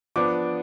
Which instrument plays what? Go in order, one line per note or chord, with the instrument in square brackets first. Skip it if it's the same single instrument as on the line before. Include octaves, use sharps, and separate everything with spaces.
[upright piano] F3 B3 D4 D6